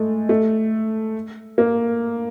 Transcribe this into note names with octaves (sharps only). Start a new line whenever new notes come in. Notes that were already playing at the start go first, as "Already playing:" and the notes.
Already playing: G#3 A3
A3
A#3